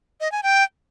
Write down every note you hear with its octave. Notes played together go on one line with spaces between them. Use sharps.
D#5
G#5
G5